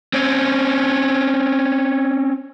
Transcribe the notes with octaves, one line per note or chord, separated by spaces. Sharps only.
C4 C#4